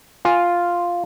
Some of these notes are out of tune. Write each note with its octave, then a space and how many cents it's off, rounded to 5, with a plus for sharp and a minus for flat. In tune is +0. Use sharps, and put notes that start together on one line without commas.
F4 +0 G#5 +0